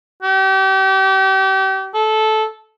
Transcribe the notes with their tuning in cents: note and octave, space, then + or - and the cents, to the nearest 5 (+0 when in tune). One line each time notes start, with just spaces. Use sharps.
G4 -35
A4 -15